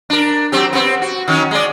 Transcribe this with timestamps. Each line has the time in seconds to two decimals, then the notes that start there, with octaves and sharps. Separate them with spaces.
0.10 D4 A#4
0.52 F#3 C4 G4
0.73 B3 C4
1.02 F#4
1.28 D#3 F#3 C#4
1.51 G#3 D5